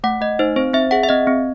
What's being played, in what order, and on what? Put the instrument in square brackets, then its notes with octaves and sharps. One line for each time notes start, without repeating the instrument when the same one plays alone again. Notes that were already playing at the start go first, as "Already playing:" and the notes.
[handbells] A3 F#5
A3 D#5
D#4 C5
C4 C5
C4 E5
G#4 F#5
E5
C4 D#5
C4